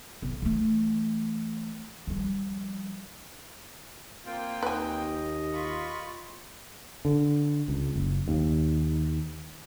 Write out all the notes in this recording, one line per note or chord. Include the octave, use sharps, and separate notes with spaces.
B1
E3 A3
F3 G3
A#3 C4 F4 G5
D#2 B4 D#5 G#5
F4 B5 C#6
D3
C#2
F#1
D#2